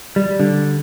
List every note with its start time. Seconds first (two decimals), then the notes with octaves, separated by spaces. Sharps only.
0.16 G3
0.39 D3